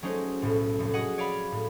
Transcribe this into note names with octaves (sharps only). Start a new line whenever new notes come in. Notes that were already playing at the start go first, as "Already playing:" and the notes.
F#3 G#3 A3 C#4 D#4 C5
B1 A2
F1 A2
F#4 G#4 D#5 F#5
C#5 D5 F5 B5
A2